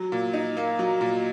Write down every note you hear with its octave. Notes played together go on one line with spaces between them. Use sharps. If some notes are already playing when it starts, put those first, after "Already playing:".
Already playing: F#3
A#2
D#4
A#3
F#3
A#2